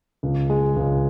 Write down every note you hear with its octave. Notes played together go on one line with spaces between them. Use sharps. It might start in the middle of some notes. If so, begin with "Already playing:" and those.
C#2
G#3
C#2